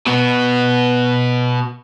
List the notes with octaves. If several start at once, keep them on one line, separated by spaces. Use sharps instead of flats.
B2 B3